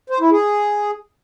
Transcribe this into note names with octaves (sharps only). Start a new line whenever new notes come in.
C5
E4
G#4